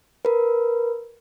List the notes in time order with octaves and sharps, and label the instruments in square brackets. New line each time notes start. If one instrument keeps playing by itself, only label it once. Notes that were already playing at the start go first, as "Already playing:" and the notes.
[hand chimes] A#4 B4